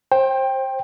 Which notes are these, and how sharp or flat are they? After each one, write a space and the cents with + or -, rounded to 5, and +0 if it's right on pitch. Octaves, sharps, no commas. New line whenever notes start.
C5 +25 G5 +5